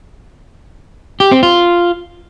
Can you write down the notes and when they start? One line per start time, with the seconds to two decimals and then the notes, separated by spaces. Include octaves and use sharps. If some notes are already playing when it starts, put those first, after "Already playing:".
1.20 G4
1.31 C4
1.43 F4